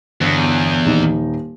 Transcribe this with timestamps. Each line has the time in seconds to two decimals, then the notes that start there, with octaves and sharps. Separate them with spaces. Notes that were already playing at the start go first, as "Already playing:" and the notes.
0.21 G1 E2
0.85 D#1 D#4